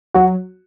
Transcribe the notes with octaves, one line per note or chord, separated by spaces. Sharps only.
F#3 F#4